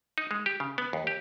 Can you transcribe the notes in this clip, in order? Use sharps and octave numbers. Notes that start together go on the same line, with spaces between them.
D#4
G#3
G4
C#3
B3
D#2
G4